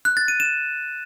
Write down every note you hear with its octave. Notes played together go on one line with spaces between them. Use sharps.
F#6
A6
D#7
E7